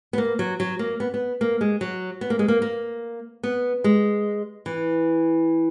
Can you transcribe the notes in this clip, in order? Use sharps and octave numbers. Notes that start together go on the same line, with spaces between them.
B3
A#3
F#3
F#3
A#3
B3
B3
A#3
G#3
F#3
B3
A#3
G#3
A#3
A#3
B3
G#3
E3